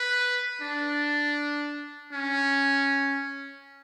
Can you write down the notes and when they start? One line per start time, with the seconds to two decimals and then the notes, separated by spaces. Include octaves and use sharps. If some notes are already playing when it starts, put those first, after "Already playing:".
Already playing: B4
0.62 D4
2.13 C#4